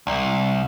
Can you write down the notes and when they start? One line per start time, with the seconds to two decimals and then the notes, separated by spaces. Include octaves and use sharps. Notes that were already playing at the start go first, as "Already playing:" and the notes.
0.07 C2